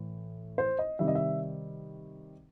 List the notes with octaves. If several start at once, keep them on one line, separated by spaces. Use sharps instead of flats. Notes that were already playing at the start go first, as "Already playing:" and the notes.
Already playing: A2 E3
C5
D#5
C3 D#3 G3 E5
D#5
E5